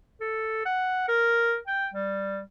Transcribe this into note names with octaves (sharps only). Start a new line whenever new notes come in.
A4
F#5
A#4
G5
G3